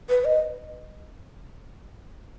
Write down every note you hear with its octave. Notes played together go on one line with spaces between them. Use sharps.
B4
D#5